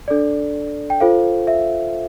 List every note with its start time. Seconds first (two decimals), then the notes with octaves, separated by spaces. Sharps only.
0.08 D4 A4 D5
0.90 G5
1.00 F4 A4 C5 F5
1.47 E5